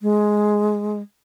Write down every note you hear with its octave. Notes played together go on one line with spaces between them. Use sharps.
G#3